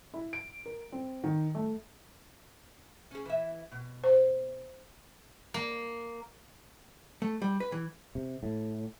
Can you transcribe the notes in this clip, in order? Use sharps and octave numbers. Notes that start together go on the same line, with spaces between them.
E4
D7
A#4
C4
D#3
A3
C#4 G#4
E3 E5
B2
C5
A#3
A3
G3
B4
E3
C3
A2